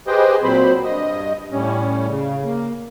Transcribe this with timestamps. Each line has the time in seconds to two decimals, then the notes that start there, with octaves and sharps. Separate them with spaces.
0.07 G4 G#4 B4 C5 D#5 G5
0.43 A#2 F#3 C4 C5 B5
0.84 G2 D#5
1.52 A2 G3 C#4
2.07 C#3
2.44 A#3